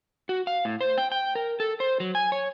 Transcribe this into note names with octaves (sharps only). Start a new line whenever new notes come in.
F#4
F5
A2
C5
G5
G5
A#4
A4
C5
F#3
G#5
C#5